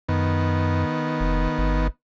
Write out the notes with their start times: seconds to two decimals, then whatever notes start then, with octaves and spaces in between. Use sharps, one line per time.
0.09 F#2 D#3 B3
1.20 F1
1.58 G1